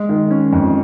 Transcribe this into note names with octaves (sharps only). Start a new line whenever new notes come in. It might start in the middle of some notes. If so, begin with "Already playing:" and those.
Already playing: G#3
D#3
C#4
F2